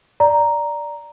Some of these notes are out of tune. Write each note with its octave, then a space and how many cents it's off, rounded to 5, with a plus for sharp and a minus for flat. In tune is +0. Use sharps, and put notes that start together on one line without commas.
D5 -5 A#5 +0